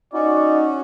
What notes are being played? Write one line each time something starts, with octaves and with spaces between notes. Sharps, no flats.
C#4 D#4 F#4 D5